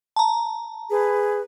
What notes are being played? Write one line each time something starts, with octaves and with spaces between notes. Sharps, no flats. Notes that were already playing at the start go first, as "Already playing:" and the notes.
A5 A#5
G#4 B4